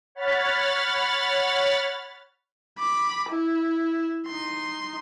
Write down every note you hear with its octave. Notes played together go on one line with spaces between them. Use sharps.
C#5 F#5 B5 F6 A6
B5 D6
E4
D#4 C6